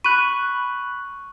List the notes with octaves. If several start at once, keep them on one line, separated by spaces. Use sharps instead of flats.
B5 C#6 F#6 D#7